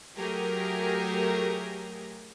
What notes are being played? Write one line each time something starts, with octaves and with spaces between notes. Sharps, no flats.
F#3 A3 G4 G#4 A#4